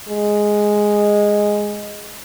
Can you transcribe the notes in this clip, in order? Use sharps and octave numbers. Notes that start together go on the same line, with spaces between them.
G#3